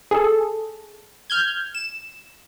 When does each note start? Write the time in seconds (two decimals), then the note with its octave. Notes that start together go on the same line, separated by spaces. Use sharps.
0.11 G#4 A4
1.30 F6 G6 G#6
1.75 E7